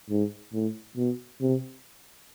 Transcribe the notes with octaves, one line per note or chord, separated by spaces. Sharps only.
G#2
A2
B2
C3